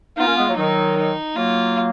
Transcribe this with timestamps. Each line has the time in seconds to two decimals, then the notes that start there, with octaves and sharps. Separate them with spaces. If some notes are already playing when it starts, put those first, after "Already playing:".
0.17 B3 D#4 F4
0.27 A#3 C#4
0.36 G#3 B3
0.46 F#3 A#3
0.56 D#3 F#3 D#4
0.97 D#4
1.36 F#3 A#3 F4